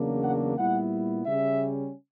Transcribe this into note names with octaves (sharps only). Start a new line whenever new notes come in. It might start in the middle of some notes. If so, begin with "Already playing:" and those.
Already playing: E2 C#3 F#3 A#3 D4
F#5
A#2 G3 B3 E4 F#5
C#3 G3 C#4 E5